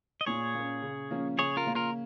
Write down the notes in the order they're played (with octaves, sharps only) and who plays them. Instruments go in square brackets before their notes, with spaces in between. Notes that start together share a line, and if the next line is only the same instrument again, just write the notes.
[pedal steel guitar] D#5
[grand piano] A#2 [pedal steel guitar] G#4 C#5
[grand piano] A#3 C#4
C#3
F3 A#3 C#4
[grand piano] C#3 [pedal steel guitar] G#4 C#5
[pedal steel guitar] F4 A#4
[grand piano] A#3 C#4
[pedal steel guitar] F4 A#4